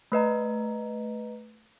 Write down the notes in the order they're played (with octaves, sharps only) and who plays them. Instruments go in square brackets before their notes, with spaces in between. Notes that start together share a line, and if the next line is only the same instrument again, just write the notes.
[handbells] A3 B4 D#5 A#5